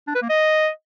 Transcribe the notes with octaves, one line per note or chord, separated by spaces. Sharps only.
D4
B4
A#3
D#5